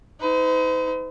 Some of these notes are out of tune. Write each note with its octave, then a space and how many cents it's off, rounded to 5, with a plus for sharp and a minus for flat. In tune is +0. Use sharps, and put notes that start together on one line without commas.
D#4 +40 C5 -45